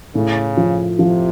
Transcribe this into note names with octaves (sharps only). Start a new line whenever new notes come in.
A2 C#3
F3
C3 F3